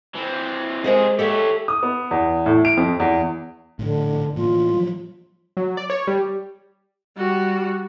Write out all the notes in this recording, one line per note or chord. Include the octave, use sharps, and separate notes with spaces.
E3 C4
C3 G#3 G#4 A#4 C5 D#5
G4 A4 C#5 D5 E5
D#6
B3
E2
A2
D7
F2
E2
A#1 A2 D3
A2 E3 A#3 F4
F3 F#3
F#3
D5
C#5
G3
G3 F#4